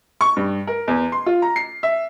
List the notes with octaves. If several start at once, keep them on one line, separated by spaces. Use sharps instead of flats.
C#6
G2
A#4
E2
C6
F4
A#5
C7
E5